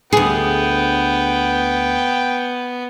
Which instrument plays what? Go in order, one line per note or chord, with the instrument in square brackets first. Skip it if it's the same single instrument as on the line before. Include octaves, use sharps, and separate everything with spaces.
[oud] D2 G#4 [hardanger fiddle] B3 [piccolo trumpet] G5